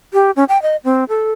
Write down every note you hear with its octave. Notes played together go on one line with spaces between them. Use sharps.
G4
C#4
G5
D#5
C4
A4